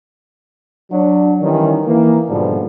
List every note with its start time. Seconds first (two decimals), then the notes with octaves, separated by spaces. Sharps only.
0.91 F#3 D4
1.41 D#3 E3 G3 C#4
1.86 E3 A#3
2.28 G#2 B2 D3 F3 G3